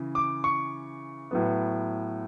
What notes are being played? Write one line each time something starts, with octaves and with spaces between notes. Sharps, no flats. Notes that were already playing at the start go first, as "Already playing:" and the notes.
Already playing: C#3 E3
D6
C#6
A2 F#3 B3